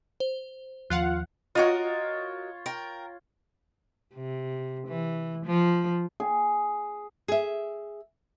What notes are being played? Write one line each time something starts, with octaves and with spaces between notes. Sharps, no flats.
C5
D#2 F3 F4 F5 F#5 F#6
F4 F#4 A#4 C#5 D#5
A#4 G5
C3
E3
F3
G#4
G#4 E5